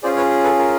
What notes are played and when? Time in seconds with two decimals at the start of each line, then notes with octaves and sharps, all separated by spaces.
0.03 C#4 F4 G#4 C5 D5
0.17 B4 C#5
0.44 A4 B4
0.59 A#4